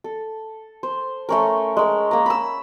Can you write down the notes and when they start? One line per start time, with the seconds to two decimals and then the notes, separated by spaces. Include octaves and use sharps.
0.04 A4
0.83 C5
1.29 A3 C#4 A#4
1.77 G#3 A#4
2.11 A#3 A#5
2.26 B5 E6